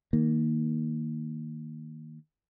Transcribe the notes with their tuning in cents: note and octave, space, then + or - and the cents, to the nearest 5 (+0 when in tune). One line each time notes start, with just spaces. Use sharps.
D#3 +0 A#3 -5